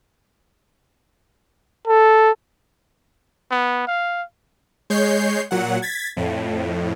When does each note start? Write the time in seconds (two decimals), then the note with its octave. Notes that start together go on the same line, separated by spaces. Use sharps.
1.87 A4
3.51 B3
3.87 F5
4.90 G#3 C#5 G6 C7
5.51 A#2 F#3 F#5
5.82 G#6 A6 B6
6.17 F2 A2